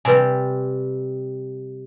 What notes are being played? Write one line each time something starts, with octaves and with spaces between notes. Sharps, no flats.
C3 G3 B4 G#5